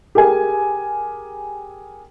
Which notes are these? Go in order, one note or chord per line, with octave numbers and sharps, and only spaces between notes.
G4 G#4 A#4 G#5